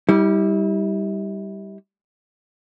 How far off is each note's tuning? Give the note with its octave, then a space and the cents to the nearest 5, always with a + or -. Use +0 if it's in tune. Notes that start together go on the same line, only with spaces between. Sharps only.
G3 +0 E4 -40